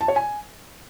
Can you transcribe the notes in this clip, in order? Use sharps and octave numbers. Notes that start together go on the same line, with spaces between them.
A5
C#5
G#5